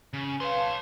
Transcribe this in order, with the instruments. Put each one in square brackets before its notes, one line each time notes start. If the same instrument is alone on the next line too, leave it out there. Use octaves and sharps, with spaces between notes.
[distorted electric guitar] C#3
[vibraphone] B4 F5 [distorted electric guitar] C#5 C6
[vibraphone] A5